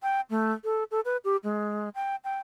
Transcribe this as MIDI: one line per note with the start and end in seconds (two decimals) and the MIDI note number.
0.03 0.21 79
0.30 0.53 57
0.64 0.84 69
0.91 1.00 69
1.05 1.17 71
1.25 1.37 67
1.44 1.89 56
1.95 2.16 79
2.24 2.38 79